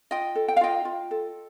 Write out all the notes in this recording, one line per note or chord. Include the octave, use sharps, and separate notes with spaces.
F4 D#5 G5
A4
G5
F5
F4 D#5 G5
F4
A4